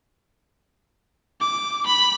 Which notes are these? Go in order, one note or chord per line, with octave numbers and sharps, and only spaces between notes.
D6
B5